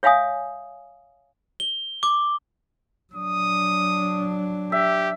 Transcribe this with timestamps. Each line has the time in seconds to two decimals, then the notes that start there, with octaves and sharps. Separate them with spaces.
0.03 C#5 E5 F5 G#5 D#6
1.60 G7
2.03 D6
3.14 F#3 D4 D#6
4.72 G4 E5